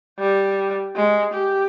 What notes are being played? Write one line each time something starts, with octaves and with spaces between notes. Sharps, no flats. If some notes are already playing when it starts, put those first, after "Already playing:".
G3
G#3
G4